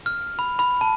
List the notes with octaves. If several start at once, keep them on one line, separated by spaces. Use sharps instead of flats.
F6
B5
B5
A5